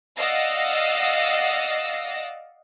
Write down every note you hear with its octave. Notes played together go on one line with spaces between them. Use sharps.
D5 D#5 F5 F#5 E6 A#6